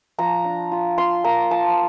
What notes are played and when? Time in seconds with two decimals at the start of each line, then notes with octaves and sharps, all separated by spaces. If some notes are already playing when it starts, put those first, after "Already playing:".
0.18 F3 A#5
0.45 D4
0.72 F4
0.98 F4 C6
1.24 A#3 A#5
1.51 F4 A5